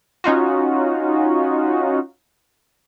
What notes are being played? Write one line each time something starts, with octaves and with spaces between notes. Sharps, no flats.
C#4 D#4 F4 F#4